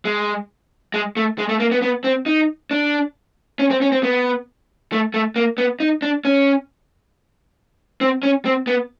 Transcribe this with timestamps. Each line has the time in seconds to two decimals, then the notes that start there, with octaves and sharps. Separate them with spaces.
0.05 G#3
0.94 G#3
1.17 A3
1.38 G#3
1.49 A3
1.60 A#3
1.72 B3
1.82 B3
2.04 C4
2.26 D#4
2.71 D4
3.59 C#4
3.71 C4
3.82 C#4
3.92 C4
4.03 B3
4.92 A3
5.14 A3
5.36 A#3
5.58 B3
5.80 D#4
6.02 D4
6.25 C#4
8.01 C4
8.23 C#4
8.45 C4
8.67 B3